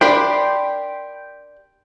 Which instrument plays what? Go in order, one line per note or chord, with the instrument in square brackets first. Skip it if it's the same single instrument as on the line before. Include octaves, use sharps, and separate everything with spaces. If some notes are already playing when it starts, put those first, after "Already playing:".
[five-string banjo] D4 G4 A#4 [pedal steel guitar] G5 B5 C6